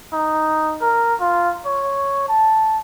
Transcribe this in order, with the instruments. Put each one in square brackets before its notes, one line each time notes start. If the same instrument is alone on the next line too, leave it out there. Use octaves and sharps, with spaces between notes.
[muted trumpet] D#4
A#4
F4
C#5
A5